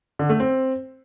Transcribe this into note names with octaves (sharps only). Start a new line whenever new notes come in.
D3
A3
C4